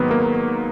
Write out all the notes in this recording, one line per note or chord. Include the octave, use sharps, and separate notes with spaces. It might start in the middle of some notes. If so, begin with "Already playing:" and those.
Already playing: G#2 D#3 F#3 A#3 B3
A#3